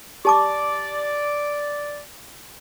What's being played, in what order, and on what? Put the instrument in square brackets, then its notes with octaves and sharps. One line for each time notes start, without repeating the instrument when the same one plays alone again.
[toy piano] G4 A5 D6 [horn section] D5